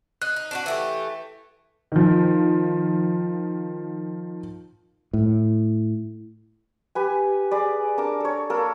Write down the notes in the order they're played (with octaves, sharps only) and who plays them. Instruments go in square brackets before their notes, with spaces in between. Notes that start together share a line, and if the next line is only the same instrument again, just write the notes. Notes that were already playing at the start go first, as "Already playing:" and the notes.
[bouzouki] D#4 [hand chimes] F#6
[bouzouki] D#4
D4 E4 F#4
E3 A3 G4
[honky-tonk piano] D#3 F3
[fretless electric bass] A2
[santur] G4 B4 G#5
G#4 B4 D5
D4 A#4 A5 D6
A4 C#5
A#3 A4 A#4